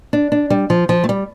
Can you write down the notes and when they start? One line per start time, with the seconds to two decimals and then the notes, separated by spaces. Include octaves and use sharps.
0.13 D4
0.32 D4
0.50 G3
0.70 F3
0.89 F3
1.04 A3
1.09 G3